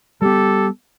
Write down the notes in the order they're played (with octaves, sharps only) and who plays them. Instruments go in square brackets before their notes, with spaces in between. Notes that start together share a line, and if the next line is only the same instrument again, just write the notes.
[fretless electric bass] G3 B3 [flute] G4 [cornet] A4